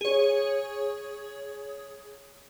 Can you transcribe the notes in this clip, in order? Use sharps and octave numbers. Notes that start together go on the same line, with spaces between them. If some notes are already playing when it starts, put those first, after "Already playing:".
G#4 C#5